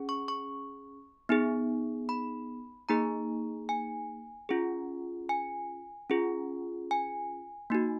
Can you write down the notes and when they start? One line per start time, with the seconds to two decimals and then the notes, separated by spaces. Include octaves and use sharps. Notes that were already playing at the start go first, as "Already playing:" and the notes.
Already playing: C#4 G#4
0.09 C#6
0.28 C#6
1.29 B3 D#4 G#4
2.09 B5
2.89 A#3 D#4 G#4 A#5
3.69 G#5
4.49 C#4 F4 G#4
5.29 G#5
6.10 C#4 F4 G#4
6.91 G#5
7.70 A#3 D#4 F#4